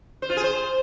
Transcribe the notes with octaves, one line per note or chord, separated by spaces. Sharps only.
C5
F4
G#4
C5